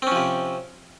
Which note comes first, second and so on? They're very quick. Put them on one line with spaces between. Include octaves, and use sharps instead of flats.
C4 C#4 F3 C3